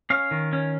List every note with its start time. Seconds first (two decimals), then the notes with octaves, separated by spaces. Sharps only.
0.10 C#4 F5
0.31 D#3
0.53 C#4